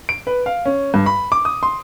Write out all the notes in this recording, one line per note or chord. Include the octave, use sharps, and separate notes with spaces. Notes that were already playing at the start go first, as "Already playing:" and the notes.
D7
B4
F5
C#4
G2
B5
D6
D#6
C6